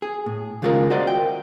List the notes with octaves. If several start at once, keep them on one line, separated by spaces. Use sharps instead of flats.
G#4
A2
D#2 C#3 G#3 F4 G#4 A#4
F#4 A#4 C5 D5 D#5
G5